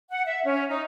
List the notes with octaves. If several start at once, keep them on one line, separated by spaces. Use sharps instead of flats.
F#5
E5
C#4
D#4